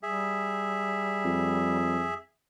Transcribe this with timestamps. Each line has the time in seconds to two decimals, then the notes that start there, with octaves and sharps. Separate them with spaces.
0.03 G3 G#4 E5
1.25 F2